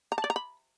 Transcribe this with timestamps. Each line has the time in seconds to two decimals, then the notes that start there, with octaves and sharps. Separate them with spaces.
0.12 A#5
0.18 A5
0.24 D5
0.30 A#5
0.36 B5